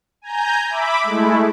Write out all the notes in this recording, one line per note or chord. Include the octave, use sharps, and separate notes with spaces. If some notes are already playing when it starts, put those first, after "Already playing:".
G#5 A#5 G6
E5 B5 D6
G#3 A3 E4